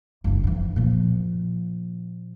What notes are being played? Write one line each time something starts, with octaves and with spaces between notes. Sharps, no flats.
F#1 G2
F2 E3
A#2 F3